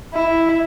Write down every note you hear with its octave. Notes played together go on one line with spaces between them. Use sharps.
E4